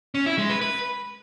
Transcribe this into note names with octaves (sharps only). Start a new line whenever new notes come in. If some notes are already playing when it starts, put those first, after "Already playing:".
C#4
E4
G#3
B4
B4